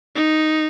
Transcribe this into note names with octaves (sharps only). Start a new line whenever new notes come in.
D#4